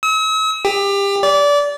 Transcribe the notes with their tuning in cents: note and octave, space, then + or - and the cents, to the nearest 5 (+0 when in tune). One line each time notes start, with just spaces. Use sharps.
E6 -45
G4 +25
D5 -25